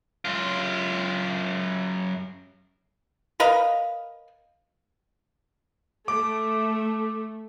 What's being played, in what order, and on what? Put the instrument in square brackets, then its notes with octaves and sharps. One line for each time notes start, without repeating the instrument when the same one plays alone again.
[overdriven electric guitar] F#2 F4
[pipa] A#4 B4 D#5 F5
[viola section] A3 [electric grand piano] D6